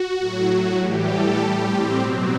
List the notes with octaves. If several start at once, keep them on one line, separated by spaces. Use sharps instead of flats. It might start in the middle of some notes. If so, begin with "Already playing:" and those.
Already playing: F#4
A2 F#3
A2 E3 G3 G4
A4
A2 G3 G4
C4
B2 F#3 C4